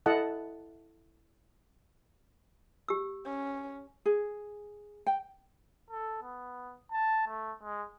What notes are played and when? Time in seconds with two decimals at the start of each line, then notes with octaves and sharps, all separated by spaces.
0.06 E4 A4 D#5 F#5 A5
2.88 G4 E6
3.25 C#4
4.06 G#4
5.07 G5
5.90 A4
6.23 B3
6.92 A5
7.28 A3
7.63 G#3